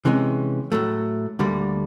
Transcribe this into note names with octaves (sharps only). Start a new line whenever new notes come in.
C3 E3 G#3 C#4
A2 F#3 A3
D2 D3 G3 A#3